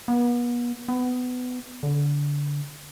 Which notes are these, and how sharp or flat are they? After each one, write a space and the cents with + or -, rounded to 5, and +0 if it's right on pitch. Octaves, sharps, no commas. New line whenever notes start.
B3 -40
B3 +20
D3 -25